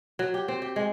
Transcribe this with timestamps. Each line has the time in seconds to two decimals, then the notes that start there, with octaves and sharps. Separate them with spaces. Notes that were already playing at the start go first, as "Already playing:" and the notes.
0.19 F#3
0.34 G4
0.48 C4
0.62 G4
0.76 G#3